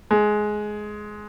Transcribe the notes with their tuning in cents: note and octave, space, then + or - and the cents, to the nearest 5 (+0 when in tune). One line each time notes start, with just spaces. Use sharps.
G#3 +15